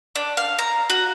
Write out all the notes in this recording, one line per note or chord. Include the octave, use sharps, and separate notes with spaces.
D4
F5
A#5
F#4